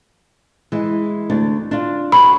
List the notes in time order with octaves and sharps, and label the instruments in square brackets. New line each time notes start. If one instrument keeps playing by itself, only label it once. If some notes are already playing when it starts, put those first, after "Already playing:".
[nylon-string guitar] E3 G#3
D2 D4
D4 F4
[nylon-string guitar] F#4 A#4 C#5 [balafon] B5